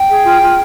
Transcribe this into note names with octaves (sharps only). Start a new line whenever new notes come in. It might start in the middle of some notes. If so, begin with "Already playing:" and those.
Already playing: G5
G#4
F4
F4